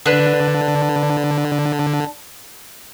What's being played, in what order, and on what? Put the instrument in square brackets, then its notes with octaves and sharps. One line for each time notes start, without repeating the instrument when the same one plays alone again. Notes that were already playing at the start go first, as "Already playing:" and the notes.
[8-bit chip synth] D3 [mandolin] D4 B4